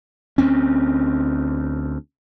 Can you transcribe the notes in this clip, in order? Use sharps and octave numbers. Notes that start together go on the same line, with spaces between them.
D2 C4 C#4